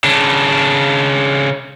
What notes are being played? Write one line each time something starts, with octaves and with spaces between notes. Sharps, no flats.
C#3 D4